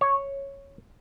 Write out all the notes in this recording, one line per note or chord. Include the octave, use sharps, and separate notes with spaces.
C#5